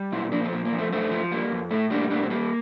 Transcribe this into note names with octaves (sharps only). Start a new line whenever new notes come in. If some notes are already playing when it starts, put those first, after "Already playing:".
Already playing: G3
A#2 C4 E4
F3 A#3 D4
C4
A#2 A#3
A#3
F3
A3 C4
G2 A3 C4
F3
G3 A#3
F2
A2 A3
G3 A#3 D4
A2 A#3 D4
C4
G3 A#3